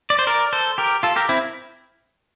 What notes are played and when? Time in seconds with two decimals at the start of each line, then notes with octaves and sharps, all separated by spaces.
0.10 D5
0.19 C5
0.27 A#4 D5
0.53 A4 C5
0.78 G4 A#4
1.03 F4 A4
1.16 G4 A#4
1.29 C4 E4